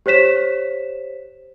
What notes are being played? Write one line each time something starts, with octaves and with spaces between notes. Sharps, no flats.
G4 C5 C#5 B6 E7